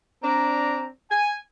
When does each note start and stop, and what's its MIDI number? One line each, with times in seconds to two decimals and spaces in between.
0.23 0.86 60
0.23 0.86 62
0.23 0.86 74
0.23 0.86 82
1.10 1.36 80